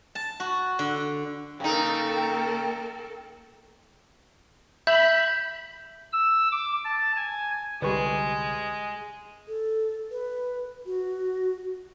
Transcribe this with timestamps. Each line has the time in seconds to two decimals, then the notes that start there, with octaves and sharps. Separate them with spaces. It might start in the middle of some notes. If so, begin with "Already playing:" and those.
0.15 A5
0.40 F#4
0.79 D3
1.60 C#3 A#3 D#4 A4 A#4 G5
4.87 E5 B5 G6
6.12 E6
6.52 D6
6.85 A5
7.16 G#5
7.82 C2 D3 G3 G#3 B4 C#6
9.48 A4
10.11 B4
10.86 F#4